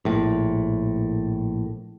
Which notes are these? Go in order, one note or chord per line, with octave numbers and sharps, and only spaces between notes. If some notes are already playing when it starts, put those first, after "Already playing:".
A#1 A2